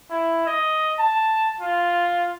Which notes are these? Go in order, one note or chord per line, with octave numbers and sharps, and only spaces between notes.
E4
D#5
A5
F4